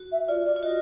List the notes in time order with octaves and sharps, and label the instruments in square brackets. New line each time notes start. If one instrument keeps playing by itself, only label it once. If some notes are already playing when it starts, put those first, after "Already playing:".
Already playing: [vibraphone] F#4
[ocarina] E5
[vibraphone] F4 [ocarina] D5
[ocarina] D5
[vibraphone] F4
[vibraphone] F#4 [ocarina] D#5